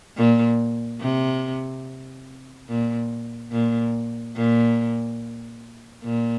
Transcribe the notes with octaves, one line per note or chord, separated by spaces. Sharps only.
A#2
C3
A#2
A#2
A#2
A#2